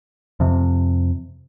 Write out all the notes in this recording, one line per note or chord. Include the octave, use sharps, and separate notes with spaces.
F2 C3